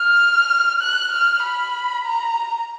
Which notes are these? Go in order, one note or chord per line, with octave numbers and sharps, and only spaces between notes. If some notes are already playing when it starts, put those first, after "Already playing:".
Already playing: F6
F#6
F6
B5
A#5